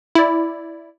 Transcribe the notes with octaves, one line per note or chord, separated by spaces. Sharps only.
E4 D5